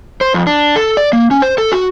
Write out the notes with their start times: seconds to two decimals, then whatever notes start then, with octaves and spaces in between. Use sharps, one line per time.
0.21 C5
0.34 F2
0.47 D4
0.76 A4
0.97 D5
1.13 A#3
1.31 C#4
1.42 C5
1.58 A4
1.72 F#4